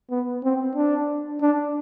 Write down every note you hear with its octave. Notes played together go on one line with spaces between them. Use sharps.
B3
C4
D4
D4